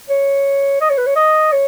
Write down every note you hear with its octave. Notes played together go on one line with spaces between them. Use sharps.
C#5
D#5
C#5
B4
C#5
D#5
C#5